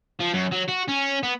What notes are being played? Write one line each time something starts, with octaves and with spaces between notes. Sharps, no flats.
F3
F#2
F#3
F#4
C#4
B3